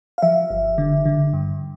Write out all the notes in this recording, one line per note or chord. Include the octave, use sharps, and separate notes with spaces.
F5
F3 E5
G1
D3
D3
G2